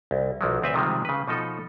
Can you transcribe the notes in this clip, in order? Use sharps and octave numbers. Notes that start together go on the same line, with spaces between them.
C2
B1 F3 F#3
D2 C4 B4 E5
C3 D#3 F3 G3 G#3
C#3 B4
B2 F3 D#4 A4